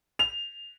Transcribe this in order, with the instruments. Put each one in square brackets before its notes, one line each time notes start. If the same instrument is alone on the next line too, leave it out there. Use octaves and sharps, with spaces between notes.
[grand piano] F7